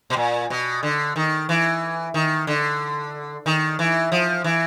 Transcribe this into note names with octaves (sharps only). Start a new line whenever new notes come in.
B2
A#2
B2
D3
D#3
E3
D#3
D3
D#3
E3
F3
E3